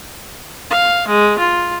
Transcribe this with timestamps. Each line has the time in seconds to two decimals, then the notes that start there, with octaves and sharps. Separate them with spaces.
0.70 F5
1.08 G#3
1.38 F4